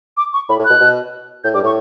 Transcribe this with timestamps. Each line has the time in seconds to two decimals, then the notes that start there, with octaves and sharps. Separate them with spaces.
0.17 D6
0.33 C#6
0.49 A2 B5
0.59 A2
0.65 B2 F#6
0.80 B2
1.44 A2 G6
1.54 G2 D6
1.63 A2 C#6